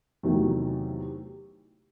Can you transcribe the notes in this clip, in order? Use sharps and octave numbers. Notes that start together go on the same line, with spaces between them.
E2 C3 D#3 F#3 A3